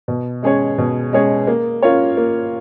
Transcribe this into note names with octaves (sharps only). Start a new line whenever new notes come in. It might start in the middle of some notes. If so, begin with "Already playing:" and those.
B2
G#3 C#4 G#4 C#5
B2
G#3 C#4 G#4 C#5
A#3
C#4 F4 A#4 C#5
A#3